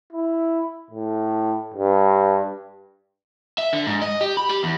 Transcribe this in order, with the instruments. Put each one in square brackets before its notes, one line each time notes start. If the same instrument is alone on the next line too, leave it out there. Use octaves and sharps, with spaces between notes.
[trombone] E4
A2
G2
[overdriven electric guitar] E5
D3
G#2
D#5
G4
B5
G4
E2